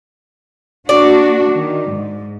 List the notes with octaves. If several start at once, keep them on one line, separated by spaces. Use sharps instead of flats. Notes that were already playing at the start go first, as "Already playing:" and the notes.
A#3 D4 F#4 D5
D#3
G#2